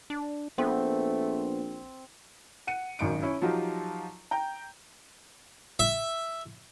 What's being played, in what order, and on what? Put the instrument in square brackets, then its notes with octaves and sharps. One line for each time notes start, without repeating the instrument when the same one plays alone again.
[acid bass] D4
[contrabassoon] A#1 [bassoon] A3 [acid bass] B3 [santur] C4
[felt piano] F#5 C#7 D#7
G#1 F#2 D#3 C#7 D7
C#4 E4
F3 F#3 D#4 F4 G4
G5 A#5 G6
[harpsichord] E5